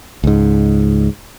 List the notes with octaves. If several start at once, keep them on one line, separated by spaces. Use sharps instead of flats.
C#2 G#2